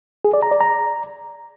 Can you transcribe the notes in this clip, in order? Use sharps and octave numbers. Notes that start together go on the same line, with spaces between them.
G#4
D5
A#5
D5
A#5